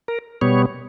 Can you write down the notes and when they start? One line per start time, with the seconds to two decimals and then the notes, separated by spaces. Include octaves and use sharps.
0.08 A#4
0.41 B2 G3 B3 C#5